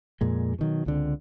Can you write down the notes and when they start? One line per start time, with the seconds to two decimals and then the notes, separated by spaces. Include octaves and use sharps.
0.21 F2 A#2 G#3
0.59 B2 D#3 F#3
0.86 C#2 D3 C4